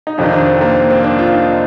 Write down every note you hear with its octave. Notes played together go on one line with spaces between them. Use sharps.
D#4
F2 C3 D#3 D4
D4
C4
A#3
C4
D4
F4
D#4